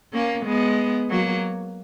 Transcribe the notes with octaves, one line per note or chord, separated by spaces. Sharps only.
A#3 C#4
G#3 B3
F#3 A#3